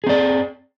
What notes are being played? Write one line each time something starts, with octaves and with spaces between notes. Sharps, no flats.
C4 G#4 D5